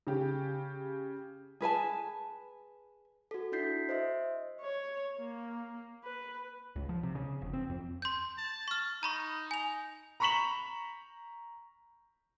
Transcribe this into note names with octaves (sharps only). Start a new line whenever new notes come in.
C#3 G4
G#4 B4 G#5 A5
F#4 A4
D4 E4 F#4 G6 B6 C7
C5 D#5 E5
C#5
A#3
B4
C#2
F3
C3
C#3
F1
C4
F2
C6 G6
A5
C#6 F6
D#4 A#5 B5 C#6
G#5 F7
A#5 B5 C#6 B6 E7 F#7